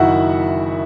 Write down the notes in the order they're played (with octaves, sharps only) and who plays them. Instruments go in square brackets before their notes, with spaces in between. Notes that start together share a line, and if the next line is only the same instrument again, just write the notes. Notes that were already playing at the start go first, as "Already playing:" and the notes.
Already playing: [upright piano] F#1 F#2 D#3 E4 F#4 E5 F#5